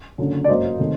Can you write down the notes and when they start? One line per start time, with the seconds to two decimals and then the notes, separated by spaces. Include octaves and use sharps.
0.18 F#1 F#2 D3
0.44 D5
0.49 G1 F#2 F#3 A#3 C5 D#5
0.79 C3 D#3 A3